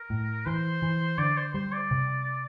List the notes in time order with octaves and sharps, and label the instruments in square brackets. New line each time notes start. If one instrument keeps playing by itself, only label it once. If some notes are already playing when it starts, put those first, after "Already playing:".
Already playing: [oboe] A#4
[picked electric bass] A2
[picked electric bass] E3 [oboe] C5
[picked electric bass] E3
[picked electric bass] D3 [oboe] D5
[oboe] C5
[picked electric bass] G3 [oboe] C5
[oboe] D5
[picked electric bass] C3